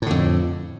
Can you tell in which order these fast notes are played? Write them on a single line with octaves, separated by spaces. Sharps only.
A2 D3 F2